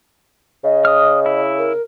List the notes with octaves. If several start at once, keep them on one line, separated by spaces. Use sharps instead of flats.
C#3 D#5
D#6 F6
E4
A#4